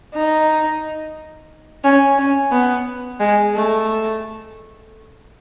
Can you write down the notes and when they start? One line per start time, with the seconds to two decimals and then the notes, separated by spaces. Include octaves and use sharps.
0.14 D#4
1.84 C#4
2.18 C#4
2.52 B3
3.20 G#3
3.55 A3